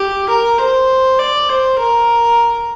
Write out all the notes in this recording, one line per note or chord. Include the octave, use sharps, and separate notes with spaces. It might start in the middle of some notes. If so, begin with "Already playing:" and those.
Already playing: G4
A#4
C5
D5
C5
A#4